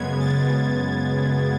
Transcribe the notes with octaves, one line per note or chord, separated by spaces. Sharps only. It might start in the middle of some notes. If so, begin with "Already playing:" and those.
Already playing: F#2 C#3 G#3 B3 G#6
A6